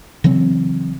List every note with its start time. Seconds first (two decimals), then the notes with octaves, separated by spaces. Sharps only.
0.24 C#3 E3 F#3 C4